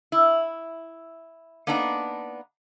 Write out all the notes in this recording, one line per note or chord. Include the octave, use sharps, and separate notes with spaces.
E4
A#3 B3 D4 D#4 A5 A#5